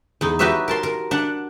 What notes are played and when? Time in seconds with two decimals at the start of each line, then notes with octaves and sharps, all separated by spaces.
0.21 E2 D#4
0.39 D#4 F#4 G4 B4 C#5 E5
0.68 A#4 A5 C6
0.83 A#4
1.11 D4 F#5